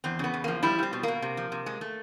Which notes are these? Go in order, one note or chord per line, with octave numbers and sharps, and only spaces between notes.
E2 C4
C#3 B3
E2
F3 A#3
G3 E4
G3 C4
B2
B2 A#3
C3
F3
C3
G#3
A3